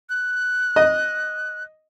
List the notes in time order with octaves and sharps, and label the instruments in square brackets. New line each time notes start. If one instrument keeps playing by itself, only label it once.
[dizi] F#6
[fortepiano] D#5